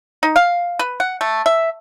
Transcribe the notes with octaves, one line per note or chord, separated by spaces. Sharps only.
D#4
F5
B4
F#5
A3
E5